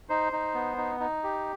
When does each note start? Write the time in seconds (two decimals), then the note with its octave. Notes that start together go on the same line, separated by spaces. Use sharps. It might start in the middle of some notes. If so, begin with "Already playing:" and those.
0.09 D#4 C5
0.33 D#4
0.54 B3
0.77 D#4
1.00 D#4
1.23 G4